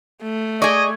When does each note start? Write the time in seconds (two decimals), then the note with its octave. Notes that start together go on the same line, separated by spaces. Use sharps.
0.23 A3
0.62 G#4 D5 D#5 C#6 G#6